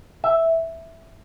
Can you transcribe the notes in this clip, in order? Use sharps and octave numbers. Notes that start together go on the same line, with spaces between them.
E5